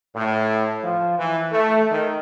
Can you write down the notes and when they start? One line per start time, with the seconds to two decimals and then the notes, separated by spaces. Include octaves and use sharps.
0.14 A2
0.83 F3
1.18 E3
1.52 A3
1.91 D#3